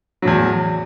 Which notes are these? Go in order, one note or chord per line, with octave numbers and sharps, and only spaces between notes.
E2 A2 F#3